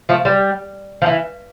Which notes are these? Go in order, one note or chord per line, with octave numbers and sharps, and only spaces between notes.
F3 A3
G3
F3
E3